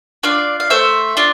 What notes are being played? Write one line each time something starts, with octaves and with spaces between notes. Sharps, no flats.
D4 F4 D5 F5
F5
A3 C5 E5
D4 F4